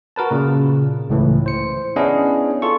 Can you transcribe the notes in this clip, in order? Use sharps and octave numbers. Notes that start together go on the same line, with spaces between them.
F#4 A#4 B4 A5
A#2 C#3
C#2 A2 E3
C5 C#7
B3 C#4 D4 E4 G#4 D#5
F4 A4 C#6